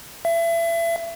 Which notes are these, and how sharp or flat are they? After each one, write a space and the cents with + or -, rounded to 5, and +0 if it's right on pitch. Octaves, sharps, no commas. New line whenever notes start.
E5 +30